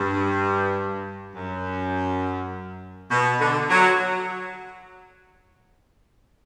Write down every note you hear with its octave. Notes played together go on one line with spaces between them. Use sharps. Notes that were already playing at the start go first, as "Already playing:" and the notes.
Already playing: G2
F#2
B2
D3
F#3